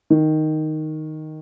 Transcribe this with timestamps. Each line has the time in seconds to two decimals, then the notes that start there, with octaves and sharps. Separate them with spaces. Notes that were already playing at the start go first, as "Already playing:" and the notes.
0.10 D#3